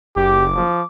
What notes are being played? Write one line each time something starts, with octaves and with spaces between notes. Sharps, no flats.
F#1 G4 D6
F3